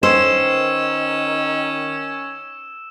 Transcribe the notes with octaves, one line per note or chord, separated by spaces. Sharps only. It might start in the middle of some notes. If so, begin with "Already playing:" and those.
D#3 C#4 C5 E6 E7